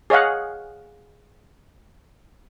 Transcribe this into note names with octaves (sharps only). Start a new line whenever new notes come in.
G#4 C#5 D#5 F5 F#5